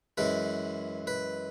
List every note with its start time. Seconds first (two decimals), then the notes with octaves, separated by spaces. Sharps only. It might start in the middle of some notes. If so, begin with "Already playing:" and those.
0.17 F#2 E3 G#3 B4
1.07 B4